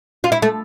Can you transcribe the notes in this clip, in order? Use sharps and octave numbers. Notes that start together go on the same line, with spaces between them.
F4
E4
A3